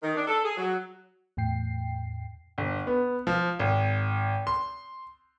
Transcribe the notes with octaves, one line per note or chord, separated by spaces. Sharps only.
D#3
D4
A4
G#4
F#3
E2 A2 G5 C7
G1
B3
F3
G#1
C6